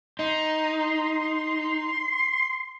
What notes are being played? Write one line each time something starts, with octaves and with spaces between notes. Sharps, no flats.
D#4 C6